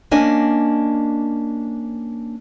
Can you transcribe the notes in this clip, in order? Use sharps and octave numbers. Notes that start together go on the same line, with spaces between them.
A#3 C#4 D4 D#5 G#5